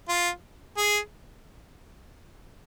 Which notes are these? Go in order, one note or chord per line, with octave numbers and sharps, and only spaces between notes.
F4
G#4